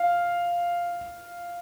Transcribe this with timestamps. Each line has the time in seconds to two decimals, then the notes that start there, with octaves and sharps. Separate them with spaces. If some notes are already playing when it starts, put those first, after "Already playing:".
Already playing: F5